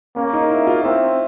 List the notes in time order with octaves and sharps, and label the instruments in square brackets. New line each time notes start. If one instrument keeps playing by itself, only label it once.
[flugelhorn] A#3 [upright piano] C#4
[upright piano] D#4
E4
F4
[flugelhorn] C4 [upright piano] E4